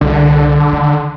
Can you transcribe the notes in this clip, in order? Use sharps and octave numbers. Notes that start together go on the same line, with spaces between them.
C2 D3
D#3